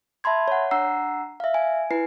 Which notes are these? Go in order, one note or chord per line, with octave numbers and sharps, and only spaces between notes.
E5 A5 B5 C6 G#6
C#5 F#5
D4 F#5 A#5 E6 C7
E5 F5
G#5
E4 B4 G#5 C7